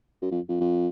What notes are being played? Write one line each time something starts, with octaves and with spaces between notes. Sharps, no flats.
F#2
F2
F2
F2